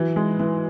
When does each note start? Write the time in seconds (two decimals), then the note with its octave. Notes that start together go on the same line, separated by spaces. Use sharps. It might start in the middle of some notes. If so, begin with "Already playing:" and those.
Already playing: E3 F#3
0.16 G#3
0.39 E3